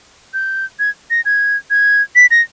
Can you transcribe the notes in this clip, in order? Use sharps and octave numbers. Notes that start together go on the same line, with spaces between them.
G6
G#6
A#6
G#6
G#6
B6
A#6